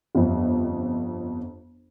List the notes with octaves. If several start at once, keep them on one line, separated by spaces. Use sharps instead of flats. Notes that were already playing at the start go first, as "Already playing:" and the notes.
G1 F2